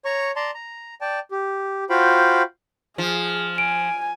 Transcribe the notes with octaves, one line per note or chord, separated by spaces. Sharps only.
C#5 A#5 C#6
D5 A5 A#5 C6
A#5
D5 G5 A5
G4
F4 F#4 C5 F5 G5 B5
F3 G#4
G#5 D7